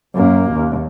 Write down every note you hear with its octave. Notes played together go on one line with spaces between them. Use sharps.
F#2 A#3
D#2